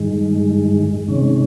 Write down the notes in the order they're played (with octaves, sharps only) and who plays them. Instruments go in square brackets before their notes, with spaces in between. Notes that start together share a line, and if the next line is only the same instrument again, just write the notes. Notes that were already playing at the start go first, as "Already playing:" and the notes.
Already playing: [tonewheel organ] G2 D#3 G#3
C3 D#3 G#3 C#4